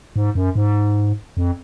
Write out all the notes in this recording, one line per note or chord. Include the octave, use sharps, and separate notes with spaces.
G#2
F#2
G#2
F2